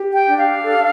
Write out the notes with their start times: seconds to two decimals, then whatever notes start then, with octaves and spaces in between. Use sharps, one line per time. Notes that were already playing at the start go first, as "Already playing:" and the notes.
Already playing: G4
0.14 G5
0.26 D4
0.38 F5
0.63 A4